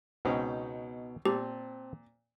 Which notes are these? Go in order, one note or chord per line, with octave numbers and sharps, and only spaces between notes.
C#2 B2 C4 C#4 D#4
A#2 C4 G4 A5